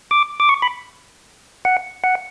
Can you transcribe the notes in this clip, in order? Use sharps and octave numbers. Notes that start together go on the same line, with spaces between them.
D6
D6
C#6
B5
F#5
F#5